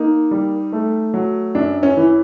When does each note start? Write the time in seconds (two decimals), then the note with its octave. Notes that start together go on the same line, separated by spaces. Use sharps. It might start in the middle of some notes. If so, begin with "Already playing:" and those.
Already playing: A#3 D#4
0.31 G3
0.72 A3
1.14 F#3
1.55 F#2 D4
1.83 C#4
1.97 E3